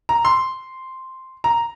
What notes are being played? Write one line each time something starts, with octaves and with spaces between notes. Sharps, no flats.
A#5
C6
A#5